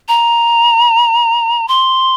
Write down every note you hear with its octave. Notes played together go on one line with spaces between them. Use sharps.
A#5
C6